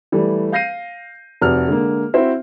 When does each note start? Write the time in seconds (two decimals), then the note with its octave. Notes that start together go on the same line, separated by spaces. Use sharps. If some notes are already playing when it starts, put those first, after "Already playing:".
0.12 E3 G3 A3
0.52 F5 G6 A#6 C7 D#7
1.42 F1 C3 F#4 F6
1.68 D3 G#3 A#3
2.14 C4 E4 F#4 C5 E5